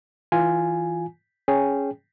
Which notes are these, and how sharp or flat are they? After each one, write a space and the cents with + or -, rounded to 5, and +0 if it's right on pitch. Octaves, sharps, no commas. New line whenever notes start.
E3 -5 F4 +0 G#5 +0
C#4 +0 G#4 +0 G5 +0